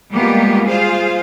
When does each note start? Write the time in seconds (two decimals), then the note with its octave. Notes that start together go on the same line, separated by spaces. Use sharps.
0.11 G3 G#3 A#3 B3 F4 G4
0.67 F4 G#4 C5 F5